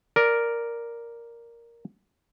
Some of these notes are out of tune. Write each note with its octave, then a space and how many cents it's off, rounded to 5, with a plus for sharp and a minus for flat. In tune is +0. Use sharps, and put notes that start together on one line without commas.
A#4 +0 D5 +0